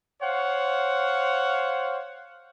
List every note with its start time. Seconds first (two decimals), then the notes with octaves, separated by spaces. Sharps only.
0.22 C5 C#5 F5 F#5